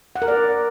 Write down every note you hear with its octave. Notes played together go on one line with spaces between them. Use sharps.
F#5
A#4
D5